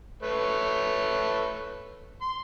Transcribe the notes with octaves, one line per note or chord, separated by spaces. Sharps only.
A3 B4 C#5
C6